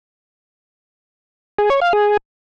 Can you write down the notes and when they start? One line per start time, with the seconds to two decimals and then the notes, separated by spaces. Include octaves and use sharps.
1.58 G#4
1.70 C#5
1.82 F5
1.93 G#4